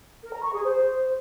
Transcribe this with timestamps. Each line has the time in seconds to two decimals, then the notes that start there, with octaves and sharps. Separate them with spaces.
0.23 A#4
0.33 A#5
0.43 C#6
0.53 G#4
0.63 C5